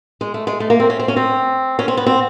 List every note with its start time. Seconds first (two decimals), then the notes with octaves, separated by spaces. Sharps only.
0.21 G#3
0.34 A3
0.47 G#3
0.60 A3
0.70 A#3
0.80 C4
0.90 C#4
0.99 C4
1.08 C#4
1.16 C4
1.79 C#4
1.88 C4
1.97 B3
2.06 C4